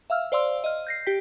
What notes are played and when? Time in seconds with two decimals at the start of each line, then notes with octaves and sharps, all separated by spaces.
0.10 E5 F5 E6 F6
0.32 C5 D5 F5 C6 E6
0.64 D#5 F6
0.87 G6 A#6 C7
1.06 G4 G5 B6